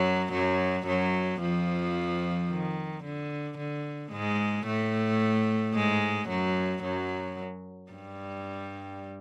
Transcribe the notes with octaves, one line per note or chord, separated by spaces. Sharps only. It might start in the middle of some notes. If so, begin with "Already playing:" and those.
Already playing: F#2 F#3
F#2 F#3
F#2 F#3
F2 F3
D#3
D3
D3
G#2 G#3
A2 A3
G#2 G#3
F#2 F#3
F#2 F#3
G2 G3